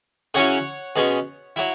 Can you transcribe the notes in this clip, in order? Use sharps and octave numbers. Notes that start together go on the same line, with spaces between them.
C#3 F#3 C#4 E4 C#5 F#5
B2 G#3 C#4
F#3 E4